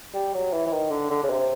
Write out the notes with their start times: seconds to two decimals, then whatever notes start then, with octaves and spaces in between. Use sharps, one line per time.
0.14 G3
0.34 F#3
0.53 E3
0.66 E3
0.72 D#3
0.91 D3
1.10 D3
1.23 C#3
1.30 C3